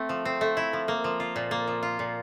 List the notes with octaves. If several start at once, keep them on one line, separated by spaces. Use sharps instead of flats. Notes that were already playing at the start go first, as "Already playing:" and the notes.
Already playing: A3 C4
F3
C4
A3
E4
F3
A#3
F3
F4
A#2
A#3
F3
F4
A#2